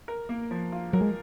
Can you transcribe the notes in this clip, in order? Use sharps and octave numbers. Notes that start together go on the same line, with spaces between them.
A#4
A#3
F3
F4
F#3 A#4
G#3